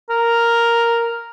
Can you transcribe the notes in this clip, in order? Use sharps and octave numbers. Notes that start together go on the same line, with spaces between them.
A#4